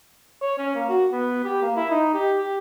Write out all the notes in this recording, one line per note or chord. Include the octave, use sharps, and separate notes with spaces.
C#5
C#4
A#3
F#4
B3
G4
A#3
E4
D#4
G4
G4